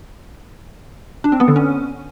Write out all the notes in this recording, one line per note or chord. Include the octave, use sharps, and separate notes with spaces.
D4
C4
B3
D3
C#4